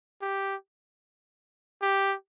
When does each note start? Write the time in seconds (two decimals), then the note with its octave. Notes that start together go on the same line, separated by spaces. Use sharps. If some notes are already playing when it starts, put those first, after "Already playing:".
0.22 G4
1.82 G4